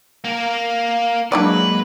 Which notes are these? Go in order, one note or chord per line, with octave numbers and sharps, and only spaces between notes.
A#3 A#4
F#3 G#3 A#3 D4 E4 B4 D5